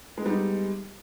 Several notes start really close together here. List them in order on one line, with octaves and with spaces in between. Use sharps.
G#3 B3 G3 D#4